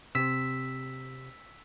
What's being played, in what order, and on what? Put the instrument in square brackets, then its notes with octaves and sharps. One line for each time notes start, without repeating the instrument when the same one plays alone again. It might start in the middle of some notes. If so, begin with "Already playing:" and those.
[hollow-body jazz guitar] C3 [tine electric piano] E6 B6